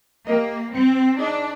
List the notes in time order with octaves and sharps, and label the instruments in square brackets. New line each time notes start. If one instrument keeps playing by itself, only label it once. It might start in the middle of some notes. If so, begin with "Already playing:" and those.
[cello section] A#3 [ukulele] G4 A#4 D#5
[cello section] C4
[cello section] D4 [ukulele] D#4 G#4 C5 D#5